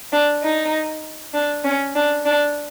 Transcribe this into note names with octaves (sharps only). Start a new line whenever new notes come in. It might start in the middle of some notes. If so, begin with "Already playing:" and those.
D4
D#4
D4
C#4
D4
D4